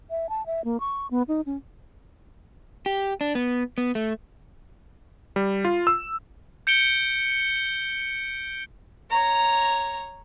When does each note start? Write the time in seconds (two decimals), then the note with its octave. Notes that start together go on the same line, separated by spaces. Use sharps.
0.10 E5
0.29 A5
0.46 E5
0.64 A#3
0.80 C#6
1.11 B3
1.28 D#4
1.46 C#4
2.86 G4
3.21 D4
3.35 B3
3.78 B3
3.95 A3
5.36 G3
5.65 F4
5.87 E6
6.67 G6 C#7 D7 G7
9.10 C#5 A#5